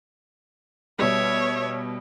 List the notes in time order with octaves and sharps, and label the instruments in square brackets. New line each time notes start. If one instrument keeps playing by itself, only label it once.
[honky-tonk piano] B2 G3 [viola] C#5 E5